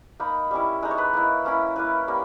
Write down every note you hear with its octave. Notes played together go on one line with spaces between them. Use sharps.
A#3 D#4 B5
G3 C#4 E4
G#3 D#4 A#5
C#5
B4
A#3 E4
A#3 C#4 E4
A#3 E4 B4
G3 A#3 C#4